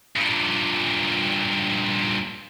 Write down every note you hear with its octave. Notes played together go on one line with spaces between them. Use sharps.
G2 A#2